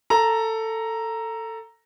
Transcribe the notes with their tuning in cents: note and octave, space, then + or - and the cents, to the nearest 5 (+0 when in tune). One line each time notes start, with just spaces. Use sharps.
A4 +15 A#5 +0